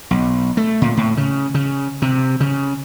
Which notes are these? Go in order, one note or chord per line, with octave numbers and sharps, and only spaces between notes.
B1
A3
A#2
A2
C#3
C#3
C3
C#3